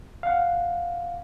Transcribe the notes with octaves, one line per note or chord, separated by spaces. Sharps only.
F5 F#5